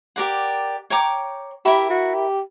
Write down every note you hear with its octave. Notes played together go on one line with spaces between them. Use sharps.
G4 A#4 D5 F#5
C#5 G5 A#5 D6
E4 G4 A#4 E5 B5
F#4
G4